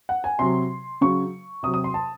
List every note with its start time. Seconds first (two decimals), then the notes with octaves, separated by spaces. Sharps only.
0.09 F#5
0.24 G#5
0.39 C3 F#3 C6
1.01 C#3 F#3 C#6
1.63 C3 D#6
1.66 F#3
1.74 D#6
1.84 C6
1.94 A5